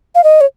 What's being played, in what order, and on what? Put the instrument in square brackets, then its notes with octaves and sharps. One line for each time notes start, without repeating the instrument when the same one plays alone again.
[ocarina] F5
D#5
C#5